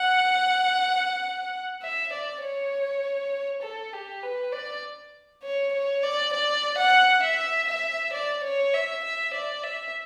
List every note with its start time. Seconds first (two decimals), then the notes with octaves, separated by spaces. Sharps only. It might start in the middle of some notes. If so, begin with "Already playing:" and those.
Already playing: F#5
1.82 E5
2.13 D5
2.42 C#5
3.62 A4
3.93 G4
4.23 B4
4.53 D5
5.43 C#5
5.73 C#5
6.03 D5
6.33 D5
6.78 F#5
7.23 E5
7.68 E5
8.14 D5
8.44 C#5
8.74 E5
9.04 E5
9.34 D5
9.64 E5